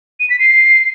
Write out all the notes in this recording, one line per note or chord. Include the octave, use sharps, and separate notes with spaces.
D#7
B6
C7